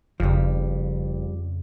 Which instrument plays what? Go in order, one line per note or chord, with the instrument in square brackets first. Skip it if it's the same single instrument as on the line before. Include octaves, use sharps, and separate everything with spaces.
[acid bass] F#1 [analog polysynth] F2 C#3 [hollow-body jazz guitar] F3 G3